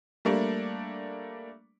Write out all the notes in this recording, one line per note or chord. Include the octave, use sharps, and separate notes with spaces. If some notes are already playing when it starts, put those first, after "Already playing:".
G3 A3 A#3 D4